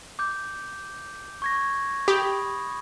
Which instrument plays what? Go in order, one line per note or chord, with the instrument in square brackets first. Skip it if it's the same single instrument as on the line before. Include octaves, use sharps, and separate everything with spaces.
[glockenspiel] D6 G6
C#6 G#6 A#6
[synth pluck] G4 [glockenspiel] B5 D#6